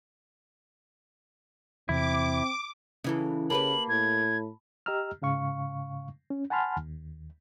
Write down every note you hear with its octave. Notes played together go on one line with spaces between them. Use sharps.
E2 C3 C4 E4 D6
C#3 E3 C#4 E4 A4
C#3 A#3 G4 B4 A5 B5 F#7
A2 G#6
G4 D#5 A#5 E6 F6
G#2 C#3 F5 C#6
C#4
F#5 G#5 A5 B5 C6 F6
D#2